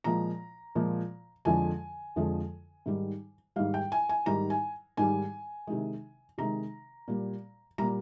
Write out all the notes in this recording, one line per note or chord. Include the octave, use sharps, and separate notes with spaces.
A#2 F3 G#3 A#5
A#2 F3 G#3
F2 D3 F3 G#3 G#5
F2 D3 F3 G#3
G#2 D#3 G3
G#2 D#3 G3 F5
G5
G#5
G#5
G#2 D#3 G3 A#5
G#5
G#2 D#3 G3 G#5
C3 D#3 G#3
C3 D#3 G#3 A#5
A#2 G3
A#2 G3 A#5